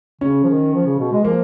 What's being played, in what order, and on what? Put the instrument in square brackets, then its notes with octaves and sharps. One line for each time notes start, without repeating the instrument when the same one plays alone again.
[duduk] C#3 [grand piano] C#4
[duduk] F3
D#3
F3
C#3
B2
G#3
[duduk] F3 [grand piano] A#3